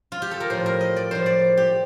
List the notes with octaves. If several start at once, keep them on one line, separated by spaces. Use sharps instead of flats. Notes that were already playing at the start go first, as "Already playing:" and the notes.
F4
G4
A4
A#4
A2 F3 C5
A#4
D#5
D5
A2 F3 C5
D5
G4